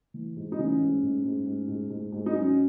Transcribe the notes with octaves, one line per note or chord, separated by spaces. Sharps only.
E3
G#2
D#4
E3 C#4
G#2
G#2
G#2
G#2
G#2
G#2
G#2
D#4
F#3 C#4